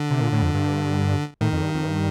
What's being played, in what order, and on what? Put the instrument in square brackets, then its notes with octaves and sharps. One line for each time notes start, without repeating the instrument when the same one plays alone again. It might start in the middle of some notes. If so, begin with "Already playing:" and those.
Already playing: [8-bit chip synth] D3
[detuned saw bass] C3
A#2
A2
F2
G2
[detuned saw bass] A2 [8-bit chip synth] D#3
[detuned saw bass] F2
G2
F2
G2